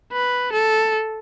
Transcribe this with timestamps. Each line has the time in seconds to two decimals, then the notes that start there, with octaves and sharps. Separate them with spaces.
0.12 B4
0.52 A4